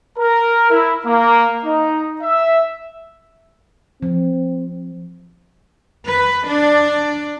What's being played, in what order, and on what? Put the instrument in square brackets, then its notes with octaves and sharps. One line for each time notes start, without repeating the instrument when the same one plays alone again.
[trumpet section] A#4
E4
A#3
D#4
E5
[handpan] F3 [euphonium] C4
[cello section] B4
D4